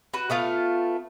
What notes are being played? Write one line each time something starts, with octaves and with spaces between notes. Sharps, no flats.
F#4 B4
A3 B3 F4